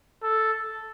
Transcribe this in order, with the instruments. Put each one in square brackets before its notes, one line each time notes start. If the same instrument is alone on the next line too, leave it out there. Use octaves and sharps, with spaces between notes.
[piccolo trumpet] A4